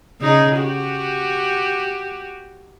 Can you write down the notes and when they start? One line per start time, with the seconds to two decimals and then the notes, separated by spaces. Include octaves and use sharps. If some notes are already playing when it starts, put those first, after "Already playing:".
0.21 C#3 D#4 G#4
0.60 F#4 G4